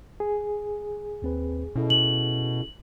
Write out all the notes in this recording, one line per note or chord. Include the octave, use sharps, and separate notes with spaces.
G#4
D#2 C4 B4
B2 C#4 E4 A4
F#7